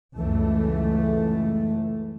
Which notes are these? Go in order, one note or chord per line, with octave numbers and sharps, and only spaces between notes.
C#2 F#2 E3 A3